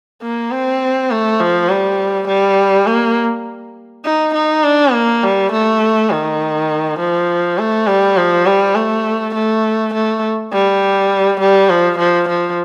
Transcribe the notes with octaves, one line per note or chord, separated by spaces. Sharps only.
A#3
C4
A3
F3
G3
G3
A#3
D#4
D#4
D4
A#3
G3
A3
D#3
F3
A3
G3
F3
G3
A3
A3
A3
G3
G3
F3
F3
F3